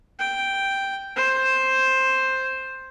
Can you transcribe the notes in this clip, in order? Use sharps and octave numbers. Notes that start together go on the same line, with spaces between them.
G5
C5